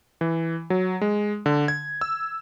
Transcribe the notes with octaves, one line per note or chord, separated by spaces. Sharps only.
E3
F#3
G#3
D3
G#6
E6